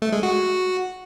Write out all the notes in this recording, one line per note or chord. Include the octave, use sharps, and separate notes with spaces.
A3
G#3
F#4